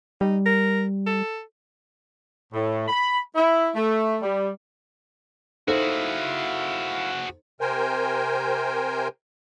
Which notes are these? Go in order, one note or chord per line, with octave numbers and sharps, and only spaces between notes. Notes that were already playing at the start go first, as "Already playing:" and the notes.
G3 D#4
A#4
A4
A2
B5
E4
A3
G3
D#4 E4 F#4 G#4 A4 C5 E5 F5
C3 A#4 C5 G5 G#5